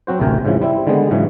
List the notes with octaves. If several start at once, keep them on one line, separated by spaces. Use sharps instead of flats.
F#3 C4 F#4 C5
A1 D2 C3 A#4 G5 G#5
G#2 C#3 E3 F3
G3 C4 E4
D3 D#3 G3 G#3 B3
G#2 C#3 E3 F#3